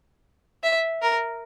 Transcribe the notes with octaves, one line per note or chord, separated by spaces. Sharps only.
E5
A#4